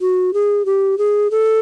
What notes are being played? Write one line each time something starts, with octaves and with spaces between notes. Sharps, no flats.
F#4
G#4
G4
G#4
A4